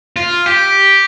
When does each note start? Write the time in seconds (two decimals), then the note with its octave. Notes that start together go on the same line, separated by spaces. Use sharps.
0.16 F4
0.46 G4